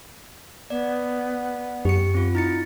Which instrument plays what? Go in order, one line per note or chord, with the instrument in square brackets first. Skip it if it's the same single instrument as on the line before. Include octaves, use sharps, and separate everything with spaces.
[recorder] B3 [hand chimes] D5
[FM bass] F#2 [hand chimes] G4 C#7
[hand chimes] C4 F4
[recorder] D#4 [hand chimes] E4 A6 C#7